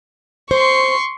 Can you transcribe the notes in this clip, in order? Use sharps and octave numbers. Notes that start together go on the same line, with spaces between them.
C5 C6 C#6